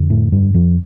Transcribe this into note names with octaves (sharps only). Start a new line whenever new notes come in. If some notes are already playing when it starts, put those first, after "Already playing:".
Already playing: F2 D3
A2 A3
G2 G3
F2 F3